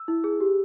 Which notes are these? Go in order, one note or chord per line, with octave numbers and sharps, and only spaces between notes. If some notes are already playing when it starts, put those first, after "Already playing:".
Already playing: E6
E4
G#4
G4